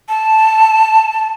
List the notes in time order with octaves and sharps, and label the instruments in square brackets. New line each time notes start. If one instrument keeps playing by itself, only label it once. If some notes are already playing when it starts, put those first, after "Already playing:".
[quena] A5